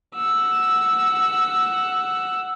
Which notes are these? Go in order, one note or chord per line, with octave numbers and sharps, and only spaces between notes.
F#5 E6